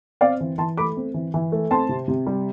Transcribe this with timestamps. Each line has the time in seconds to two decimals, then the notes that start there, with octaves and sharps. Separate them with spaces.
0.21 C4 D5 F5
0.41 E3
0.58 E3 A5 C6
0.77 A3 B5 D6
0.97 C4
1.14 E3
1.34 E3
1.52 A3
1.70 C4 A5 C6
1.89 C3
2.08 C3
2.27 G3